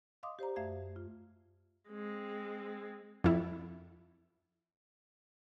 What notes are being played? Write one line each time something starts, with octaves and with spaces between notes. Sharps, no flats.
D#5 F5 C6 D6 D#6
G4 C5 D5 A#5
F#2 A3 E5 F5 G#6
F4
G#3 C4
F2 E4